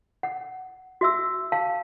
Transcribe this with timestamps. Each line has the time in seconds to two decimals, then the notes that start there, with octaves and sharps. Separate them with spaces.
0.23 F#5
1.01 F#4 E5 E6
1.52 F5 A5